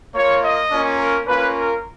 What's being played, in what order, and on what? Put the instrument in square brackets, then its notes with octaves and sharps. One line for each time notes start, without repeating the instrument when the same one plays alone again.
[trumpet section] A#3 F4 C#5
D#5
A#3 C#4 F4
A#4
A#3 C#4 F4 B4
A#4